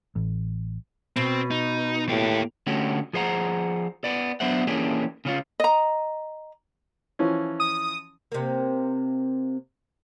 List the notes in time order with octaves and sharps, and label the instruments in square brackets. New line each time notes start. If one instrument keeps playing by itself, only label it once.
[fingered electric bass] A1
[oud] B2 [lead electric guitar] C4
[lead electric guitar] D#4
[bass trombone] A2 [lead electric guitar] A#3 G4
[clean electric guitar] D3 A3 C#4 F#4 G4
F3 G#4 C5 F#5 A#5
B3 D5
F#3 B3 D4 C5 E5 F#5
E3 A#3 C#4 D4 G4 G#4
C#3 C#4 F4
[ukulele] D#5 A#5
[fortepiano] E3 F3 C#4
[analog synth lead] D#6
[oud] C3 A#3